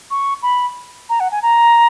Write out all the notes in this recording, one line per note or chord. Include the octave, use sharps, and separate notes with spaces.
C#6
B5
A#5
F#5
G#5
A#5